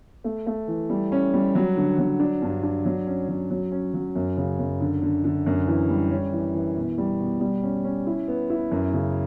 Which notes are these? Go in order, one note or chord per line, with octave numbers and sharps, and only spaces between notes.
A3
A3
E3
G3
C#4
G3
F#3
D3
F#3
D4
G2
D4
F#3
C#4
F#3
F#3
C#4
F#3
F#2
C#3
F#2
D3
D3
D3
F#2
E3
G3
C#4
E3
E3
B2
G3
B2
G3
C#4
C#4
E4
B3
E4
F#2
C#3